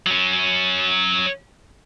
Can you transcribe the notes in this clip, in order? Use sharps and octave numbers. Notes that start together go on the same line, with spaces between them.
F#3 C#4